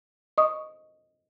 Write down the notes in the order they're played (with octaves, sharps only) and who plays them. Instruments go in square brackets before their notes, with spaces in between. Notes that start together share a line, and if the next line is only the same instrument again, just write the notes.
[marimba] D#5 C#6 D#6